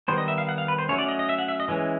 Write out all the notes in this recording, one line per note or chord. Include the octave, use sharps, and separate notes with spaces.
D#3 G3 B3 C5
D#5
E5
F5
F#5
F5
B4
C5
F#3 A3 C#4 C#5
D5
D#5
D#5
E5
F#5
E5
D#5
E3 G#3 C#4